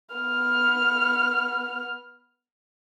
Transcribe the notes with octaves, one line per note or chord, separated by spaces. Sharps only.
B3 F6